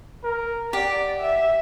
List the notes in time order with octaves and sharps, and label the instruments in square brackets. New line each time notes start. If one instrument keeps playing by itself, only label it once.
[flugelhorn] A#4
[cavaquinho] G4 [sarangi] D5 [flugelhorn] F#5
[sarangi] E5